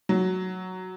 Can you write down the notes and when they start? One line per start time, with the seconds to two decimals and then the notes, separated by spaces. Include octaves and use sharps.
0.09 F#3